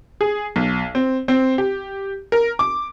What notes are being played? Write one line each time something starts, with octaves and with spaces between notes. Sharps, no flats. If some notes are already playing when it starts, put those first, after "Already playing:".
G#4
B1
C4
C4
G4
A#4
D6